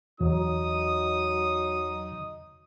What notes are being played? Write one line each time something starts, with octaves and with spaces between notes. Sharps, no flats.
E2 F#3 D#4 D#6